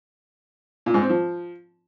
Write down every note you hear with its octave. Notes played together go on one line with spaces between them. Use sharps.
A#2
G#2
C4
F3